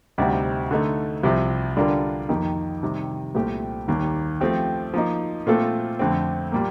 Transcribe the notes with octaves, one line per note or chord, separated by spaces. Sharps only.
D2 C3 G3 C4 D#4
D3 A3 D#4
C2 C3 F3
D3 G3 D4 F4 A#4
F2 D#3 A#3 D#4 G4
C3 D#3 G3
C2 A#2 A3 C4 G4
D#2 D#3 G3 A#3
F3 A3 C4 G4
F3 A#3 D#4
A#2 A3 C4 F4 A4
F2 D3 A3 C4
A#2 G3 A#3